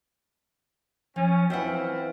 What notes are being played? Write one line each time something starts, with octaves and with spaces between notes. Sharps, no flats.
F3 C#4
E3 C4 F4 C5 E5 F#5